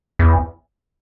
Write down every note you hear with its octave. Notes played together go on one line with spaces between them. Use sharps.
E2